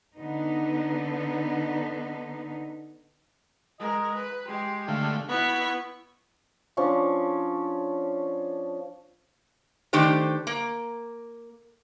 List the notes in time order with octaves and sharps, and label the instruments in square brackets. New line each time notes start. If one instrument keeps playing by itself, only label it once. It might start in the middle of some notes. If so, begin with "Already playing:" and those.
[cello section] D3 B3 D#4
[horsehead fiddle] G#3 A#4 [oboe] D#5
[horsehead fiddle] B4
[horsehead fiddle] G#3 G4 [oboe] C6
[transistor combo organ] D3 A3 [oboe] F5
[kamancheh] B3 C#6 [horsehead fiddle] E4 [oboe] F#4 [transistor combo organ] B5
[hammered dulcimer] F3 C#4 D4 C#6
[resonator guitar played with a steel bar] D#3 A3 D4 G4 C5
A#3